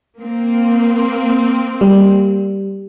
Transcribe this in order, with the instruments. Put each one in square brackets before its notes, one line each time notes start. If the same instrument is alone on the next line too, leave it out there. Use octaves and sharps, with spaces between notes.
[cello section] A#3 C4
[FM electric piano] G3